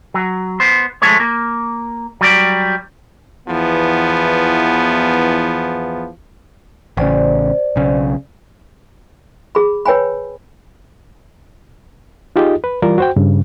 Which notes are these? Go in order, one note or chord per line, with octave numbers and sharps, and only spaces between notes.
F#3
B3 C5
F3 G#3 A3 C#5
A#3
F#3 G3 D5
E2 E3 F3 B3
A1 C#3 C5 D5
B1 C#3
G#4 B5
B4 C#5 G5 G#5 B5
D#4 F4 G4 G#4 D#5
B4
E3 G3 F4 A#4 D5
F#4 C5 G5
G2 C#3